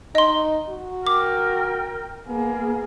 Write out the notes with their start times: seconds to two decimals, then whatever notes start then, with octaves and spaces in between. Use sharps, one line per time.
0.15 D#4 D#5 C6
0.69 F#4
1.07 A#4 G5 D6
2.28 A#3 B3 G#4